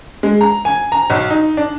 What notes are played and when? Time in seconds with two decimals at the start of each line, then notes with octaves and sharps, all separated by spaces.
0.23 G#3
0.41 A#5
0.65 G#5
0.92 A#5
1.10 B1
1.30 D#4
1.57 D4